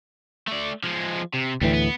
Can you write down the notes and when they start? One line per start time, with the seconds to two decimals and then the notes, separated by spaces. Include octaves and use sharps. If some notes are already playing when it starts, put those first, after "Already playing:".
0.48 A3 D5
0.83 F3 G#3
1.33 C3
1.61 D2 A2 E3 G3 C4
1.73 B3